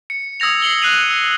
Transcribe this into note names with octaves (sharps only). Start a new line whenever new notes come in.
C#7
D#6 E6 G#6 A#6 F7
C7 C#7 F#7 G7
E6 F#6 C7 D#7 F7 F#7
E6